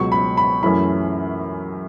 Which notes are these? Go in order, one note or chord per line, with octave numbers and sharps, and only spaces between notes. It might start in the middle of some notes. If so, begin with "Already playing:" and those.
Already playing: C#2 B2 F#3 C#6
B5
B5
F#2 E3 A3 C#4 E4 B5